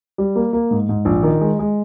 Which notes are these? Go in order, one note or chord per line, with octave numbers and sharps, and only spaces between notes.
G3
A#3
A#3
G#2
G#2
A#1
D#3
G#3
G#3